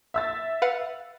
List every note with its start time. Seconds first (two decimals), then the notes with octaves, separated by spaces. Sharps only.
0.14 E5 E6 A6
0.62 B4 F5 F#5